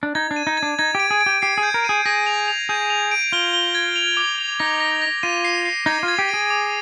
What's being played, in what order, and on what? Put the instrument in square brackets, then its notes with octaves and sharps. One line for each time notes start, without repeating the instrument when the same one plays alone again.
[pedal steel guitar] D4
[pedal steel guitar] D#4 [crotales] G#6
[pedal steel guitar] D4
[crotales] D#7
[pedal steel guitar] D#4
[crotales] G#6
[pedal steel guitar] D4
[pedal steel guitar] D#4 [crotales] G#6
[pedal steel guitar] G4 [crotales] D7
[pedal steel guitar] G#4
[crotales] D7
[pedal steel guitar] G4
[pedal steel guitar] G4 [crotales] C7
[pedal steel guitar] G#4
[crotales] G6
[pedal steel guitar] A#4
[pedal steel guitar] G#4 [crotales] D#7
[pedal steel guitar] G#4 [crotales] A#6
[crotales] F7
F7
[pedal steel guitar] G#4 [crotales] G6
[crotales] F7
D7
[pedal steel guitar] F4 [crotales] G7
[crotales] G7
G#6
F7
D6
F7
[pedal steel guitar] D#4 [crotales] A#6
[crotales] A#6
A#6
[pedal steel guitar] F4 [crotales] D#7
[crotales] C7
C7
[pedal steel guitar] D#4 [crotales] G#6
[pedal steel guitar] F4
[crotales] G#6
[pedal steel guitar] G4
[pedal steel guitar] G#4 [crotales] D7
[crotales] D6